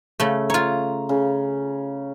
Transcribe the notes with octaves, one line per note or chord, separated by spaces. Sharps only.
C#3 A3
F4 C#5 A#5
C#3